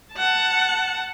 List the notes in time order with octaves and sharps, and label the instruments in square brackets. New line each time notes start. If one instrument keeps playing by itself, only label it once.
[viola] F#5 A5